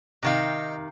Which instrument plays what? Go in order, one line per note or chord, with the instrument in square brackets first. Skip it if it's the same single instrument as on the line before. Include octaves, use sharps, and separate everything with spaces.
[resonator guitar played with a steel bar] C3 D#3 F5 [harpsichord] D#4 G5 A#5